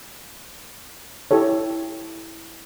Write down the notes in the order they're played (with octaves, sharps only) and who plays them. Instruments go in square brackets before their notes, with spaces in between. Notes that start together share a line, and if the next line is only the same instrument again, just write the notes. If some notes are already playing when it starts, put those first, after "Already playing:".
[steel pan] E4 G4 A4 C#5